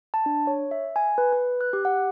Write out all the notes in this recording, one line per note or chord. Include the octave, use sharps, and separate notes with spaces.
A5
D4
C#5
E5
G#5
B4
B4
F#6
G4
F#5